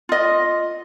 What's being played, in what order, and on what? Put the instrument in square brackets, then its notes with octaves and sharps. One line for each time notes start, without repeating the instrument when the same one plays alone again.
[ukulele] F4 D#5